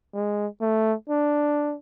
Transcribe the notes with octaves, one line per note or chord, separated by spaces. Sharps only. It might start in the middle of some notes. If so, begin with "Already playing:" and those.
G#3
A3
D4